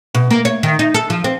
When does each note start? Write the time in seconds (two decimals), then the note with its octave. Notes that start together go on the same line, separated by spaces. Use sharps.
0.15 B2
0.31 A#3
0.45 C#5
0.63 D#3
0.79 D#4
0.94 A4
1.10 F3
1.24 C4